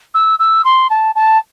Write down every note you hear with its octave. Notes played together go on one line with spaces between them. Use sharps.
E6
E6
C6
A5
A5